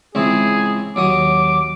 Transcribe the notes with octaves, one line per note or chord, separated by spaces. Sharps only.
C#2 E3 C4 G#4
D#2 F#3 D6 D#6